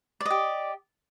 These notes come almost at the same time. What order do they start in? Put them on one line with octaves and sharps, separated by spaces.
D5 D#5 G4